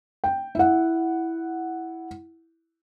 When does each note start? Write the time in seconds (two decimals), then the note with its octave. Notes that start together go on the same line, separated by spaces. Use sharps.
0.24 G5
0.55 E4 F#5